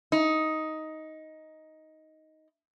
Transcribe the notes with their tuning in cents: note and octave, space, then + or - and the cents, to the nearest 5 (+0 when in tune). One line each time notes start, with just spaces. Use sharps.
D#4 +10